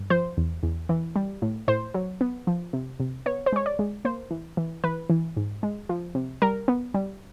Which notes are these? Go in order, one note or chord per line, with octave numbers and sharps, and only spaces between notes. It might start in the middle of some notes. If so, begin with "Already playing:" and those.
Already playing: G2
F3 C5
E2
E2
E3
G3
A2
A2 C5
F#3
B3
F3
C3
C3
B3 C#5
C5
G#3 C#5
D5
G#3
A#3 C5
E3
E3
E3 B4
E3
G#2
G#3
F3
C3
G3 A#4
B3
G3